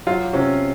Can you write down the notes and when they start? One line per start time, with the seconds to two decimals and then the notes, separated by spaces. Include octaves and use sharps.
0.07 F#3 F4
0.33 C3 C#4